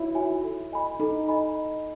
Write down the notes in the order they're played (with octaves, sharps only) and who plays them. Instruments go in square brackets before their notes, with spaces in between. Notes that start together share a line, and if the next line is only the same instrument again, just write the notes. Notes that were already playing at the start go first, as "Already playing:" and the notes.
Already playing: [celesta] D#4 F#4 C#5 [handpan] E4
[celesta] F#4 C#5 E5 G#5
A4
D#5 G#5 B5
[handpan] D#4 [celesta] A4
[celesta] D#5 G#5 B5